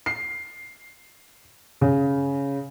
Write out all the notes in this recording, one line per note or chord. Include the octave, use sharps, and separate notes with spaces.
C7
C#3